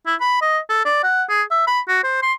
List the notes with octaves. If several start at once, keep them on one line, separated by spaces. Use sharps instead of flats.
E4
B5
D#5
A4
D5
F#5
G#4
E5
B5
F#4
C5
C6